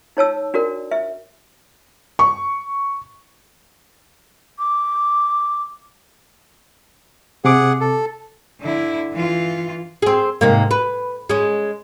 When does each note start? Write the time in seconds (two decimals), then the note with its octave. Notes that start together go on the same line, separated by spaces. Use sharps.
0.17 D#4 C#5 A5 E6
0.54 D4 F#4 A#4 D5
0.91 E5
2.19 C#6
4.59 D6
7.45 C3 G#4 F#5 D6
7.81 A4
8.61 D3 E4
9.12 E3 F4
10.02 C4 G#4
10.41 G#2 C3 A#3
10.71 B4
11.30 G#3 C#4